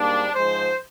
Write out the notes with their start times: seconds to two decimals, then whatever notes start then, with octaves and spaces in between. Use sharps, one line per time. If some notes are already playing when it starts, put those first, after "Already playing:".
Already playing: G#2 G3 A#3 D4
0.35 G#2 F3 G#3 C5